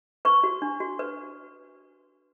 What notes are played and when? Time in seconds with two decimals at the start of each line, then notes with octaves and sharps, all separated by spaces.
0.25 B4 C#6
0.44 F#4
0.62 D4
0.80 F#4
0.99 B4